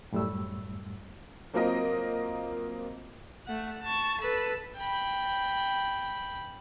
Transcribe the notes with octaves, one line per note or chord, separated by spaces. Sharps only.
F#2 A2 G3 A3 E6
F#3 A#3 C4 F4 A#4 D#5
A3 F#5
A5 C#6
A4 B4
G5 B5